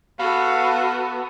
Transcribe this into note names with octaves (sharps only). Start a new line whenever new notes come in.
B3 F#4 A4 F5 F#5